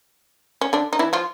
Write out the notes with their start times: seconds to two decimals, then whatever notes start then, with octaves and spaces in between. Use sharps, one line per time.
0.61 C#4
0.73 D3 D4
0.93 D#4
0.99 E3 E4
1.13 F3 F4